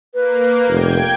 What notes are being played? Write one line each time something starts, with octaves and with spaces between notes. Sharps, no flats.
A#3 B4
F1 G5 G#6